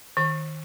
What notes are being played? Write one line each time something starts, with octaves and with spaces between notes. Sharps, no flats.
D#3